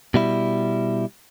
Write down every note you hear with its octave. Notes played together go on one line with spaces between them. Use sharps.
B2 G3 E4